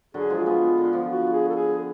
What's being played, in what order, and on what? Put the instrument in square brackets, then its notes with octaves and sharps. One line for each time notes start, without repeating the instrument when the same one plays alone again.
[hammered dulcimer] D3 F#3 [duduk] G#4
[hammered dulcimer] F3 G#3
[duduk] F4
[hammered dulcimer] G#3 B3
D3
F3
[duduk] F#4
G#4
A4
G#4